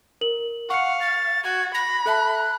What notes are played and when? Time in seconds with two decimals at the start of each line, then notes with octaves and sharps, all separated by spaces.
0.21 A#4 F#7
0.70 F5 F#5 C#6 C#7
1.00 A6
1.44 F#4 G#6
1.74 B5 A#6
2.06 A4 E5 A5 F#6